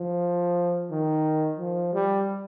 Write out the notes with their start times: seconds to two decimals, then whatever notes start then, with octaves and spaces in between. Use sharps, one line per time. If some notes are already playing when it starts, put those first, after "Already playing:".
Already playing: F3
0.90 D#3
1.59 F3
1.93 G3